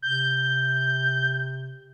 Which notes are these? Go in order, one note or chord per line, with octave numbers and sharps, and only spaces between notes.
C3 G6